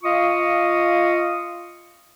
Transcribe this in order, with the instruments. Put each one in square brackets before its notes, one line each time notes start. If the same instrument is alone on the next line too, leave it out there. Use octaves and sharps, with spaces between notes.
[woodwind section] F4 D#5 F5 C#6 D#6